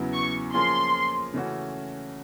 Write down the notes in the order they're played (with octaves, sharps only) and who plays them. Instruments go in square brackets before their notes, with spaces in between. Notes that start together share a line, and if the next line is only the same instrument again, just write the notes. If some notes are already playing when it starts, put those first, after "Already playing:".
Already playing: [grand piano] E2 C#3 F#3 B3 E4
[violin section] C#6
[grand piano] F3 A#3 C#4 F4 G#4 [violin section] C6
[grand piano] C#3 E3 A3 C#4 F#4